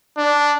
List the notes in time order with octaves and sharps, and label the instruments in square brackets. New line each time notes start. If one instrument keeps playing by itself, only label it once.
[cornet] D4